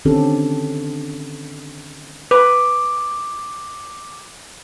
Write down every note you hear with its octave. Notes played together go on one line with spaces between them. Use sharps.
D3 D#3 C4 C#4 G4 A4
B4 D6